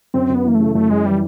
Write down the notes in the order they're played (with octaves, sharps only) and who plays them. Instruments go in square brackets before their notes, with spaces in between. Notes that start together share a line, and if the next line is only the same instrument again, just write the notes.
[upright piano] F#2 [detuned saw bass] C4
[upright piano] F#2
[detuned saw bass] B3
[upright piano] E3 [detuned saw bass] A#3
[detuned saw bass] A3
[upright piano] C#3
[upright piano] F#2 [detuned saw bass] A3
[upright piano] F#2 [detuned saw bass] G#3
[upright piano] E3 [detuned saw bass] G3